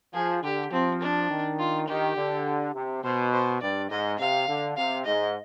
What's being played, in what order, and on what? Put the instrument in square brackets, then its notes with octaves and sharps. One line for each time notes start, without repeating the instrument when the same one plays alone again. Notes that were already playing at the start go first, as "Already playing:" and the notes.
[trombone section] F3 [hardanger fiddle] G#4
[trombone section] D3 [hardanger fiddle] G4
[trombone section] F3 [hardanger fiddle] C4
[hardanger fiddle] D4
[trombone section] D#3
[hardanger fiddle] F4
[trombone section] D#3 [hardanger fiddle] G4
[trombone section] D3
C3
[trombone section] B2 [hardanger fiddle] C5
[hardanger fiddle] C5
[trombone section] G2 [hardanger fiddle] D5
[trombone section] G#2 [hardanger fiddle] D#5
[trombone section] C3 [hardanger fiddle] F5
[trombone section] D3
[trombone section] C3 [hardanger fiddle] F5
[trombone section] G#2 [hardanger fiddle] D#5